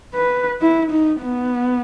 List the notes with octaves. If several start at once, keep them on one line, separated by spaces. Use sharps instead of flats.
B4
E4
D#4
B3